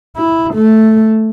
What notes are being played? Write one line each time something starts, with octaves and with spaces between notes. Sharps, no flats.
E4
A3